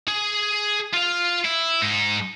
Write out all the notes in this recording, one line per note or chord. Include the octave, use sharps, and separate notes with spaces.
G#4
F4 F5
E4
G#2 D#4